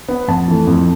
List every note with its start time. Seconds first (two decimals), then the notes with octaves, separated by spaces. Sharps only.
0.08 B3
0.28 F2 A5
0.48 E3 A3
0.67 F2